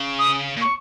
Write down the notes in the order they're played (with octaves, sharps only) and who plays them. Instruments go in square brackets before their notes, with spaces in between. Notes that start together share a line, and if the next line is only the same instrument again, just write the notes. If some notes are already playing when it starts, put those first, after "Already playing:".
Already playing: [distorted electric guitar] C#3
[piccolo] D#6
[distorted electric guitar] A#2
[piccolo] C#6